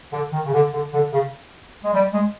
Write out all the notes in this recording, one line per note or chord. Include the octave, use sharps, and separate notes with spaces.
D3
D#3
C#3
D3
D3
D3
C#3
G#3
G3
G#3